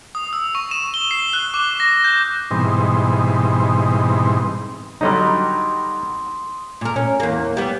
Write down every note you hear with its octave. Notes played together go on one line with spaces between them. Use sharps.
D#6
E6
C#6
E7
G7
C7
F#6
D6
A#6
G6
G#2 B2 E3 G3 C4 D#4
D3 F#3 G3 D#4 D#5 C6 D#6
A#2 A#4
C#4
E2 A#3
G3 B3